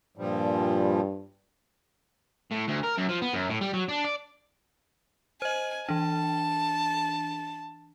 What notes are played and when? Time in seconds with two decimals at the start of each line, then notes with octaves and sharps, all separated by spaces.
0.18 G2 A#2 F3 G3
2.51 A2
2.68 D2
2.83 A#4
2.97 F#2
3.09 F3
3.22 B3
3.34 F#2
3.50 A2
3.61 G3
3.73 F#3
3.89 D4
4.04 D5
5.42 C5 D#5 G#5
5.89 E3 D4 A5